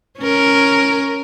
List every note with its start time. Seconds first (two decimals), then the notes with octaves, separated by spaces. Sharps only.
0.18 C#4 A#4